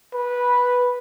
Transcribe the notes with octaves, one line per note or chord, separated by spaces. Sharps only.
B4